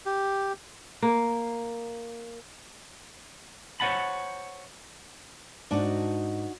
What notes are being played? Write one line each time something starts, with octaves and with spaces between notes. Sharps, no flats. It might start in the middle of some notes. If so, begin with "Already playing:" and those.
G4
A#3
C5 C#5 F5 F#5 A5 B5
G#2 D4 D#4 F#4